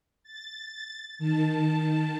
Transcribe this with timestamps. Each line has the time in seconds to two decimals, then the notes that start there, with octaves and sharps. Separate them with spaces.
0.23 A6
1.19 D#3 A5